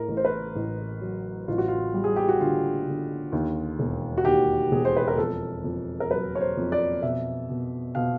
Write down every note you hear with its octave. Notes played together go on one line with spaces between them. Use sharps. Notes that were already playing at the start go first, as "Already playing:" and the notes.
Already playing: A2 A#4
A1
C5
B4
A1
F#3
A1 F4
F#4
F4
G3
G#4
G4
F#4
D3 F4
D3
D#2
E1
F#4
D#2 G4
E1 G#4
C5
B4
A#4
F2 A4
F2
A#4
F#3 B4
C#5
C5
F2
D5
B2 E5
B2
B2 F5